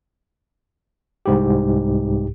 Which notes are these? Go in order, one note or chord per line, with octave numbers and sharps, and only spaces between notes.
C2 G#2 G4